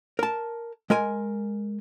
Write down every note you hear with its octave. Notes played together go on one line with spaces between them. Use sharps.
A#4 A5
G#3 A#4 G#5